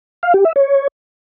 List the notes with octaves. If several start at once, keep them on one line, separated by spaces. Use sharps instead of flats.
F5
G4
E5
C#5